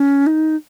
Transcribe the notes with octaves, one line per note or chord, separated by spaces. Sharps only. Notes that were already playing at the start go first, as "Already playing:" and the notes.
Already playing: C#4
D#4